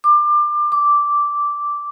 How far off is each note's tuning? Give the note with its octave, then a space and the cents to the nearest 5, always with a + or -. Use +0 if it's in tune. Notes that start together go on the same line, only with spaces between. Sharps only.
D6 +25
D6 -5